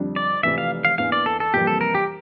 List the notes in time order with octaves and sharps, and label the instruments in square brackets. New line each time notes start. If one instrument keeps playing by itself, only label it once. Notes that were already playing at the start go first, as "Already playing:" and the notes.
Already playing: [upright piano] F2 D3 G3 D4
[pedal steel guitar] D5
[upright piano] F1 F2 E3 [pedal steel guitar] E5
[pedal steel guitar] F5
F5
[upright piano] E2 E3 A#3 D4 [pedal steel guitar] F5
[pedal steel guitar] D5
A4
A4
[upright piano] F2 C3 E3 G3 A#3 [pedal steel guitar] G4
[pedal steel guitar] A4
A#4
G4